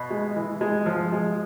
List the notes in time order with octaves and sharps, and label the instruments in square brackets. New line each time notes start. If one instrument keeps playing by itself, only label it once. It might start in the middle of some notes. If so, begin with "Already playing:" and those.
Already playing: [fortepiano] B2
G#3
E3
G#3
F3
G#3